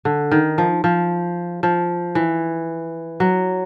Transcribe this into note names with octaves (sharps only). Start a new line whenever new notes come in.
D3
D#3
F3
F3
F3
E3
F#3